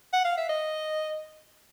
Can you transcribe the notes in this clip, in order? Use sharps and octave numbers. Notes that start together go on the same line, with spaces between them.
F#5
F5
E5
D#5